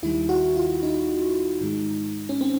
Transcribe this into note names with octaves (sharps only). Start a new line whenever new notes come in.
D#2 D#3 G3 E4
F#4
F4
D#4
G#2 D#3 G#3
C#4
C4